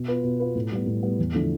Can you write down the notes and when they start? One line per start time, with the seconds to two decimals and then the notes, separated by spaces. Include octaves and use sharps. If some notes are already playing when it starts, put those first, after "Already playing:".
Already playing: B2
0.08 B3 F4 B4
0.23 B2
0.40 B3 F4 B4
0.55 A2
0.72 G3 B3
0.86 A2
1.03 G3 B3
1.19 E2
1.34 D3 F3 A3 E4